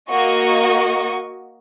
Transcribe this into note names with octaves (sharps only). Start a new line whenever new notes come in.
A#3 F#4 D#5 C#6